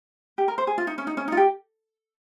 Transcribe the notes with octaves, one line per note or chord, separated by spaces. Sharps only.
G4
A#4
C5
G#4
F4
D#4
C#4
D#4
C#4
D#4
F4
G4